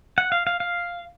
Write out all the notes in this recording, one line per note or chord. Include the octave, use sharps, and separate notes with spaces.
F#5
F5
F5
F5